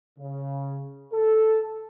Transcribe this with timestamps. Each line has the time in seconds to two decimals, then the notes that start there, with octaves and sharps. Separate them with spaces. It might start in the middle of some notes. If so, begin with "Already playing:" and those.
0.19 C#3
1.13 A4